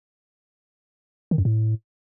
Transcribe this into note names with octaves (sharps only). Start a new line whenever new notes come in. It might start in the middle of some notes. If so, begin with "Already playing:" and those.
D#3
F#2
A2